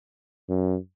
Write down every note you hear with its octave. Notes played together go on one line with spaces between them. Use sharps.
F#2